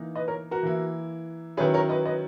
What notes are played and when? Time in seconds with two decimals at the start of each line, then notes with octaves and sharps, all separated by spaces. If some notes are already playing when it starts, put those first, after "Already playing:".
Already playing: E3 A#3 D#4
0.15 B4 D#5
0.28 A#4 C#5
0.51 F#4 A#4
0.63 E3 A#3 E4
1.57 D#3 F#3 C#4 E4 G#4 B4
1.74 A#4 C#5
1.89 B4 D#5
2.06 B4 D#5